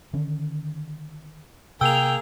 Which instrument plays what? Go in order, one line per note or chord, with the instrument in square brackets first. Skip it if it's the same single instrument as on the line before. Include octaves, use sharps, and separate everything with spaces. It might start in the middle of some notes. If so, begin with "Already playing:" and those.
[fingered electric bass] D3 D#3 C#4
[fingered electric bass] C3 [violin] A#3 G#4 [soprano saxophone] G5 [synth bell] E6 F7